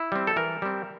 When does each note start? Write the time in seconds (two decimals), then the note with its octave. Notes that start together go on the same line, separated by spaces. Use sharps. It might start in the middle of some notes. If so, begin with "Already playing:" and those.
Already playing: E4
0.12 G3 C4
0.27 A4
0.36 E3 A#4
0.62 G3 C4